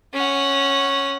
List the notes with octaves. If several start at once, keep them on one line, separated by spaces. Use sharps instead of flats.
C#4 F#5